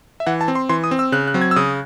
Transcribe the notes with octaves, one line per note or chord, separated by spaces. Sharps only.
E5
E3 F#5
A5
C4
C6
E3 C6
D#6
C4
E6
C#3 F#6
F#6
F#3 C4
G#6
E6
C#3 D#6